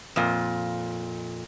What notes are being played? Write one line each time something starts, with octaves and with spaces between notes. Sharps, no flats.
F2 A#2